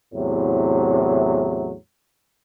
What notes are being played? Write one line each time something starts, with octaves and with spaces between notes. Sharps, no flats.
E2 A2 C3 F#3